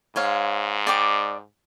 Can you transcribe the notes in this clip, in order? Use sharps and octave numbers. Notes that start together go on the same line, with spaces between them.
G#2 C5 C#5 F5
D5 G5 D6